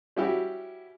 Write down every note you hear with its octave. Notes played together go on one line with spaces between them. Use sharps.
G3 C#4 E4 F#4 G4